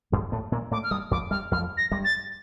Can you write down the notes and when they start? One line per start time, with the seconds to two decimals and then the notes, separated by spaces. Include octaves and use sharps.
0.12 G2 G3
0.32 A2 A3
0.52 A#2 A#3
0.71 A2 A3 D6
0.84 F6
0.91 G2 G3 D#6
1.11 F2 F3 D6
1.31 G2 G3 F6
1.51 F2 F3 F6
1.77 A#6
1.92 G2 G3
2.04 A6